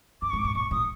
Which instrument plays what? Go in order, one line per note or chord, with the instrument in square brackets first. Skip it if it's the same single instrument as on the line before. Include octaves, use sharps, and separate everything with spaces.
[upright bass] G2 [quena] D6
[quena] C#6
[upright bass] G#2
[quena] D6
[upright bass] A2 [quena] C#6
[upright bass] A#2 [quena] C#6
[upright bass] A2 [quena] D#6